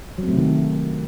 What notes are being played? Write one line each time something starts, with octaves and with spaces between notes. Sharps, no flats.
C3 D#3 F#3 A3 C4